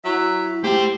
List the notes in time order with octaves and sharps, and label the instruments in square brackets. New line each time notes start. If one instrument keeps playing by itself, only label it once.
[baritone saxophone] F#3 [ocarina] E4 [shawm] E5
[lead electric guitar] A3 G5 [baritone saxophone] G4 [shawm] C5